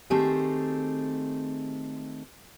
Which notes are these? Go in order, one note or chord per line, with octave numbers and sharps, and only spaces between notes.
D#3 A3 C4 G4 G#4